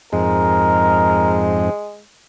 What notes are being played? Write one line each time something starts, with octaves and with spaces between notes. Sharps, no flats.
F2 G#2 G#3 A#4